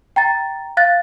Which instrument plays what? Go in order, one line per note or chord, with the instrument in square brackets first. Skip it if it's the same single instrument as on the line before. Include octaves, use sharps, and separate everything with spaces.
[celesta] G5 A#5 A6
F5 F#6 A6